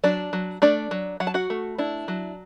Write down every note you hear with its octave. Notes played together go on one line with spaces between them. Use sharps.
F#3 D4 D5
F#3
A3 D4 D5
F#3
F#3 F#5
A5
F#4 F#5
A3
D4 E4
F#3